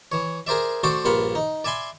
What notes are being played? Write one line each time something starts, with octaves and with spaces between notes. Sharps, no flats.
E3 C#5
G#4 A#4 C5 D5 E5
A3 F#4 A4 C5 D5
A#1 G2 A#3 F4 F#5 B5
D#4
D5 E5 G#5 B5 C6